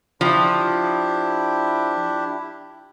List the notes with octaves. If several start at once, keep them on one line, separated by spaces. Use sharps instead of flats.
F3 D4 E4 G4